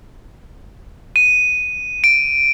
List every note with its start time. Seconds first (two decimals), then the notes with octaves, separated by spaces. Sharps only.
1.16 D#7
2.04 D7